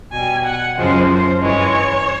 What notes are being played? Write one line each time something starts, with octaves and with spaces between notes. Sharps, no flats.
B2 G3 G#5
F#5
F#2 C#3 F3 G#3 C5
C5
G2 E3 G#3 C#5